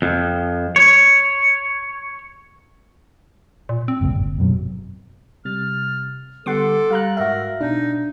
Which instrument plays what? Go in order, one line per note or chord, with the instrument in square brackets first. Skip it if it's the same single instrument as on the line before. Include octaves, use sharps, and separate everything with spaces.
[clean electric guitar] F2
C#5
[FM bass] A#2
C4
[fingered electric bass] G1 C#2 A#2
G1
F#2 B2 F#3
[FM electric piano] C3 G3 A6 [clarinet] F6
[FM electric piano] D3 G3 B3 [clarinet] A4 [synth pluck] F#5 C6 D6
[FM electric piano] G3 [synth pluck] F5 A#5 F#6
[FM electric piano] G#2 F#6 [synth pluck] F#4 E5 [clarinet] A#4
[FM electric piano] B2 [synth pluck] D4 [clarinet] D#4